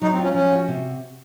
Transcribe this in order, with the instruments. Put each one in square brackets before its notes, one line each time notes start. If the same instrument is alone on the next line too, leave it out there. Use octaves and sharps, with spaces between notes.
[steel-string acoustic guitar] F#3 [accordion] D#4
[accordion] C4
[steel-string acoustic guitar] F4
[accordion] C#4
[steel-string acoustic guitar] F3 [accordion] C#4
[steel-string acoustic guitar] F#4
C3